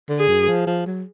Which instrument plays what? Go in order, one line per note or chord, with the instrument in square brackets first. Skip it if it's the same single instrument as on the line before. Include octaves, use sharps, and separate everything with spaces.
[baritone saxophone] D3
[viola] G#4
[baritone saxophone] F#2
F3
F3
F#3